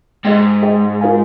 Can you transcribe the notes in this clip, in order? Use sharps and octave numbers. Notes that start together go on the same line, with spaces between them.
G#2 G#4 D#5 G5
G#4 D#5 G5
F4 A#4 F5 G#5